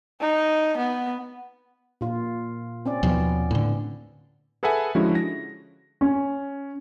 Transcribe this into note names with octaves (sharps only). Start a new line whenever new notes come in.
D#4
B3
A#2 F4
C4 C#4 D5
D#2 B2 F3 B3
A2 D3
G#4 A4 B4 E5 F#5 G#5
D3 F3 G#3 C#4 E4 F#4
A#6
C#4